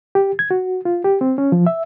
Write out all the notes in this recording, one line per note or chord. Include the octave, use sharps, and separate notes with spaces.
G4
G#6
F#4
F4
G4
C4
C#4
F3
E5